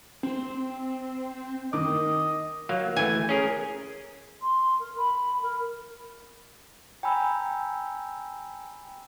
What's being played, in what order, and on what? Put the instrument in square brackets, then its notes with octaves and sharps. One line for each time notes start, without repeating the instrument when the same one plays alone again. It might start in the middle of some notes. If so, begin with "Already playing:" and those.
[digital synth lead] C4
[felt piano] D#3 D6 [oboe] D#5
[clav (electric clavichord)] F#3 A#3 F5
[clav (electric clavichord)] E3 A3 [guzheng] G#5
[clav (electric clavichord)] C#4 G#4 A#4
[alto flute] C6
A#4
B5
A#4
[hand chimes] G5 G#5 A#5 B5 E6